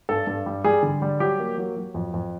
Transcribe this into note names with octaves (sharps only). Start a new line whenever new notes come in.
G2 A4
G2
G3
G3 G#4
D3
G3
F#3 G4
A#3
F#3
F#3
F2
F2